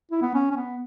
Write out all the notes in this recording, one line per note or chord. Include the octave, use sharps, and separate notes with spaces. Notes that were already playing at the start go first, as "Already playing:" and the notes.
E4
B3
C#4
C#4
B3